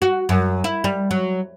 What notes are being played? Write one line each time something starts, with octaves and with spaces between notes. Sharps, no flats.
F#4
F#2
E4
G3
F#3